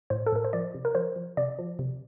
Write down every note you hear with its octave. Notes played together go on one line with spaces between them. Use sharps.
A2 C5
A4
A2 A#4
C5
F3 D5
C3
A#4
F3 C5
F3
C3 D5
F3
C3